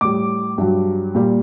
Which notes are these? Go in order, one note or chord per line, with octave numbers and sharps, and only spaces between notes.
A2 G3 D6
G2 F#3
A#2 G3